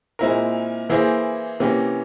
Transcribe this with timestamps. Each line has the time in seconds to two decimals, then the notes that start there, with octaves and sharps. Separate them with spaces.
0.19 A#2 G#3 C4 E4 A#4
0.90 E3 A#3 E4 G#4 C5
1.60 C3 E3 A#3 C#4 G4